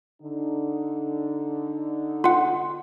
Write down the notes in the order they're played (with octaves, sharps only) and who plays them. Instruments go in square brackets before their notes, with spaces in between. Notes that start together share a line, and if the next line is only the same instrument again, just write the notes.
[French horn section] D3 D#4
[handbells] F4 F#5